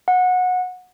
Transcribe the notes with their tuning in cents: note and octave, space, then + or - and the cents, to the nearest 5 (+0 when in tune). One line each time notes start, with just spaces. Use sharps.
F#5 -20